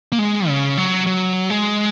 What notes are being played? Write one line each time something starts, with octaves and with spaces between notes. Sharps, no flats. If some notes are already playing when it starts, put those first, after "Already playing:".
A#3
G#3
C#3
F#3
F#3
G#3